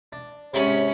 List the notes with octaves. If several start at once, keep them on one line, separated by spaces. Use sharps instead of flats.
D4
G#2 C3 C#4 C#5 B5